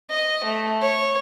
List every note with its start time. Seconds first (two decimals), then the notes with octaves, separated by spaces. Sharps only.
0.10 D#5
0.44 A3
0.81 C#5